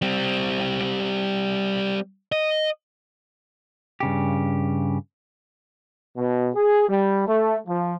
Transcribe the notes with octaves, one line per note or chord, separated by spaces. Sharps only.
G3 C4
D#5
G2 C#3 G4
B2
G#4
G3
A3
F3